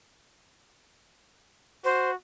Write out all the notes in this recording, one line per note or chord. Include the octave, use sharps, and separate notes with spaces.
F#4 C5